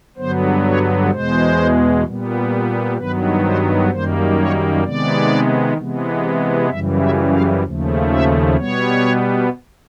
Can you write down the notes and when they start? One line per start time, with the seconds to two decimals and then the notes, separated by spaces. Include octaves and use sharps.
0.17 G2 D3 F#3 B3 C5
0.64 C#5
1.10 E2 B2 G#3 C5
2.04 A#2 G3 B3
2.97 G2 D#3 F#3 B3 B4
3.43 C5
3.90 F#2 D#3 G3 A#3 C5
4.38 C#5
4.84 C3 D#3 G#3 B3 D5
5.77 C3 E3 G#3 B3
6.70 F#2 C#3 E3 G3 E5
7.01 E5
7.33 F5
7.63 D#2 C#3 F3 A3
8.10 E5
8.56 B2 G3 B3 C#5